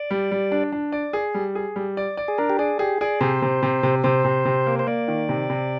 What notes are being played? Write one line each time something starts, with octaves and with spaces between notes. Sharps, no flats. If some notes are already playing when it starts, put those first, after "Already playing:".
Already playing: D5
G3
G3
D4
D4
D5
G#4
G3
G#4
G3
D5
D5
G#4
D4 A#4
G4
G#4 D5
G4 G#4
G#4 D5
C3 C5
C3
C3
C3
C3 C5
C3
C3
A#3
C5
A#3 D5
D#3
C3
C3